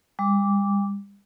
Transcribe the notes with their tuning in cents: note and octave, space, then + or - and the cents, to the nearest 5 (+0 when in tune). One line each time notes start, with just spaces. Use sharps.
G3 +40 D6 -10